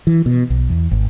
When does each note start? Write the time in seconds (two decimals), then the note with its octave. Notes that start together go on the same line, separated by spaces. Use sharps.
0.07 E3
0.26 B2
0.50 B1
0.69 E2
0.91 G#1